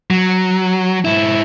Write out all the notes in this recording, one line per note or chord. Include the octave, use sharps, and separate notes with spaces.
F#3
G#2 E4